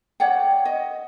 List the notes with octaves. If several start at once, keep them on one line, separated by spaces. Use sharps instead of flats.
C#5 D5 F#5 G5
D#5